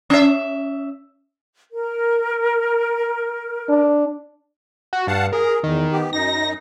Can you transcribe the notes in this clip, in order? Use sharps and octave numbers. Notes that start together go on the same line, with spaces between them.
C#4 E5
A#4
D4
F#4
G2 F5 F#5 A5
G#4 A#4
E2 D#3
B3 G4
F#2 D#4 A#6